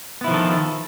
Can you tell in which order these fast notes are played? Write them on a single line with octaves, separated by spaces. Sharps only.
B3 E4 F3 D#3 A4